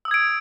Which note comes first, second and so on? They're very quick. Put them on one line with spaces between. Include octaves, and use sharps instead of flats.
E6 D#6 G#6 D7